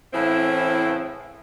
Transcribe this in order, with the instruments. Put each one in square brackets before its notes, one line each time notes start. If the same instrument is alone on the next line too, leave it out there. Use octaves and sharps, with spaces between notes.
[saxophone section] A2 C#3 E3 C4 E4